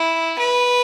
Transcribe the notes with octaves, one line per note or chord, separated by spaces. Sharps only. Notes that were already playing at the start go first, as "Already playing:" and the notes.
Already playing: E4
B4